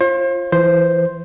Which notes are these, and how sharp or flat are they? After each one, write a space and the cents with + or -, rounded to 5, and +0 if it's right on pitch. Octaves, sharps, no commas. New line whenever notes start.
F4 -10 C5 +40
E3 +20 C5 +0